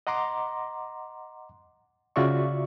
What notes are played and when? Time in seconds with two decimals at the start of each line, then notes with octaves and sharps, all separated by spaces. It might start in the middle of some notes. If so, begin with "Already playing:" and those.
0.07 D#5 F#5 A#5 C6 D6
2.16 C#3 F4 F#4 D5 E5 C#6